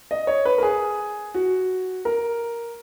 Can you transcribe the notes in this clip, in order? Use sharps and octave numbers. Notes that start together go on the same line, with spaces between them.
D#5
C#5
B4
A#4
G#4
F#4
A#4